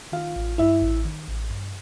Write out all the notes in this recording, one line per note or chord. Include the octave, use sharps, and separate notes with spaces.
D#3 F4 F5
A1
G2 E4 E5
A1
D#3
A1
G2